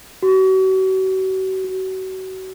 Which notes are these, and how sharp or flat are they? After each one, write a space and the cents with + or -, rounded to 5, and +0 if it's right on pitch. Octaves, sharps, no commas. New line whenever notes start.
F#4 +40
F#4 +30